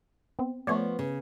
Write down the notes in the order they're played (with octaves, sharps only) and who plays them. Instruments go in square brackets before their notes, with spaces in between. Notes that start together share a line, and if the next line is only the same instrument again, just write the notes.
[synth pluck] B3 C4
[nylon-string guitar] F3 B3 [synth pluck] A3 C#5 D5
[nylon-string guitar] C#3